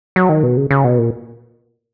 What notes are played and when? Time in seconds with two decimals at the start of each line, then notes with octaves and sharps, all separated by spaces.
0.16 F#3
0.29 D#3
0.43 B2
0.57 C#3
0.71 C#3
0.84 B2
0.98 A#2